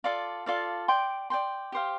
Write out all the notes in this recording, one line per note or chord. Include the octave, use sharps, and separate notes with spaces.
F4 A4 D5 F5
F4 A4 D5 F5
D5 G5 C6
D5 G5 C6
G4 C5 F5